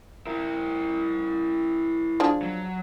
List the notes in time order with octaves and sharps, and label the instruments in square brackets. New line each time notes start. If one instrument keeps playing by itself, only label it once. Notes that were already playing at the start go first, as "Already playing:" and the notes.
[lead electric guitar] E4 A#4
[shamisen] F3 D4 G#4
[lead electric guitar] F#3